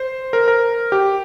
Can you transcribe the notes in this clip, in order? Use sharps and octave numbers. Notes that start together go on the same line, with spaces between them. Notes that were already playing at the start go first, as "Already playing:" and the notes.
Already playing: C5
A#4
A#4
G4